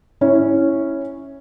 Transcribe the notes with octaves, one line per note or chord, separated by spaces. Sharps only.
C#4 E4